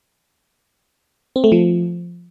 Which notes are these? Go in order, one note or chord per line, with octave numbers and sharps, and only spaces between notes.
C4
A3
F3